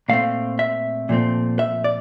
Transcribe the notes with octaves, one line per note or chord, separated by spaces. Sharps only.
A#2 A3 C4 F5
E5
A#2 F3 A3 C4
E5
D5